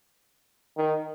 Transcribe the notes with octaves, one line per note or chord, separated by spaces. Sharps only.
D#3